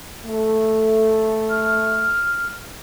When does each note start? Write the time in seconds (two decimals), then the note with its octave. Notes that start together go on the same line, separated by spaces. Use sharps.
0.26 A3
1.50 F6